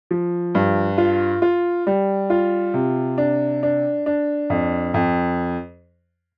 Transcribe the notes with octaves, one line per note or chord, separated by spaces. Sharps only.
F3
G2
F4
F4
G3
F4
C3
D4
D4
D4
F2
F2